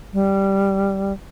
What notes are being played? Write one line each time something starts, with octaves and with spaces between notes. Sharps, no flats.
G3